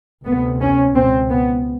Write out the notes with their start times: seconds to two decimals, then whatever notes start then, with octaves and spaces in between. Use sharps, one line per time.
0.25 D2 C3 B3
0.61 C#4
0.95 C#2 B2 C4
1.30 B3